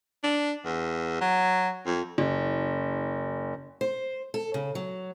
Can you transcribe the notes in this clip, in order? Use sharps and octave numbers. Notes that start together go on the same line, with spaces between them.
D4
E2
F#3
F2
F#1
C5
A4
C#3
F#3